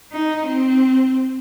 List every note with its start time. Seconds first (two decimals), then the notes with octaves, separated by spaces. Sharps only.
0.13 D#4
0.47 C4